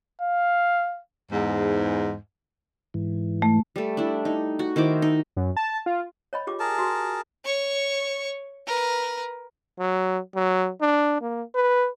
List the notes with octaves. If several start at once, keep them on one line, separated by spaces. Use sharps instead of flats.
F5
E2 G#2
G#2 E3
A3
G3 A3
D4 E4
D#4
F#4
D#3 E4 C5 D6
D#4
F#2
A5
F4
C#5 D#5 B5
F4 G4 D6
G#4 A#4 A5
F#4
C#5 C#6
A#4 B4
F#3
F#3
D4
A#3
B4